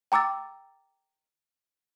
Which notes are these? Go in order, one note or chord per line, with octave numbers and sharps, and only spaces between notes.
G5 A#5 D6 E6 A6